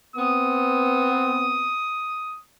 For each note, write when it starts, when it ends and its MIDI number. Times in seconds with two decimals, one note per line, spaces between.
0.16 1.72 59
0.16 1.72 60
0.16 2.40 87